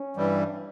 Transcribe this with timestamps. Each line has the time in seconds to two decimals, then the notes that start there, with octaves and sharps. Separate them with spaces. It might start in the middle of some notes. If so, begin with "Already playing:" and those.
Already playing: C#4
0.16 G2 E3 G3